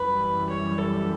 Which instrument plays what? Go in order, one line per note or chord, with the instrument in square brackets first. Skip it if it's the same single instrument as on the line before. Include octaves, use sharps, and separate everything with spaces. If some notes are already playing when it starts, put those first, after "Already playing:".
Already playing: [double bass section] F#2 E3 G3 [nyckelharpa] B4
[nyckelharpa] C#5
A4